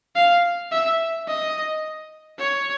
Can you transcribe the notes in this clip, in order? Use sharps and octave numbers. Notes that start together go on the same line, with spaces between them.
F5
E5
D#5
C#5